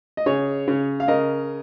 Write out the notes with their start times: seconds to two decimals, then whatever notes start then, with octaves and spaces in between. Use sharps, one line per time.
0.17 D#5
0.26 C#3 G#4 C#5
0.68 C#3
1.00 F5
1.08 C#3 A#4 D#5